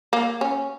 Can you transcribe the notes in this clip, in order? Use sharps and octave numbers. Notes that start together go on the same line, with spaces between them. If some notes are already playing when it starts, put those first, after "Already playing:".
A#3
C#4